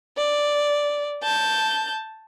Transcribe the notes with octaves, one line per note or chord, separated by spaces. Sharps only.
D5
A5 G6